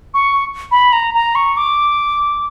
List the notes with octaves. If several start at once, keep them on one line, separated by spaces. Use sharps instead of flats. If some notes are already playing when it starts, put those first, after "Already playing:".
C#6
B5
A#5
A#5
C#6
D6